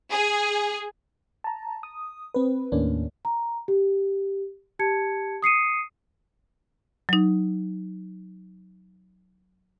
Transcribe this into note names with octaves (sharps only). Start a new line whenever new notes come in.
G#4
A5 A#5
D#6
C4 B4
D#2 A2 A#3 C#4 D4
A#5
G4
G4 A5 G#6 C#7
D#6 C7 C#7 D#7
F#3 D#4